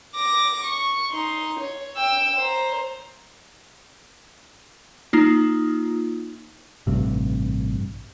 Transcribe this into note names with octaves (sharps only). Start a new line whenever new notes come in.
D6 A#6
C#6
D#4 C6
C#5
G5 E6
C5 A#5
A#3 D#4 F4
A1 G2 C3